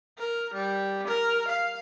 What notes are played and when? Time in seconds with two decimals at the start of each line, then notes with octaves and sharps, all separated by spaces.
0.18 A#4
0.54 G3
1.08 A#4
1.48 F5